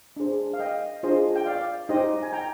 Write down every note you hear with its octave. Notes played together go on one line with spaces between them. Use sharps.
D4 G#4 C5
F5
D#5 G5
D4 F4 G#4 C5 D#5
G5
D5 F5
D#4 G4 C5 D#5
G#5
G5 A#5